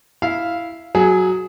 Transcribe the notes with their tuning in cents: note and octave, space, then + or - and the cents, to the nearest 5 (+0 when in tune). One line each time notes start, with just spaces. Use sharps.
E4 +0 F5 -5
F#3 +0 G#4 +15 F#5 +0